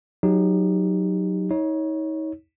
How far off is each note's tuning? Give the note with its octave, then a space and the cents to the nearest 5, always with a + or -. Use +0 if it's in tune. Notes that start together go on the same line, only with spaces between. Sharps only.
F#3 +0 D#4 +0 G4 +25
D#4 +35 C#5 +0